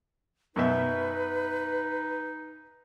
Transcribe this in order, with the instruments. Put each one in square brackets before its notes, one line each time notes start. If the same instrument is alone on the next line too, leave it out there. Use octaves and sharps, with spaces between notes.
[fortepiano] F#2 B2 E5 [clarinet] D#4 [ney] B4